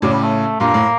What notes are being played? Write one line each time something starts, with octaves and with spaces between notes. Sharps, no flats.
A2 C#3 D4
G3
A3
G2 A#2 A#3
A2